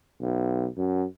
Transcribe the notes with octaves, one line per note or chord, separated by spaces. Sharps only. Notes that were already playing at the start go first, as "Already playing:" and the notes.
B1
F#2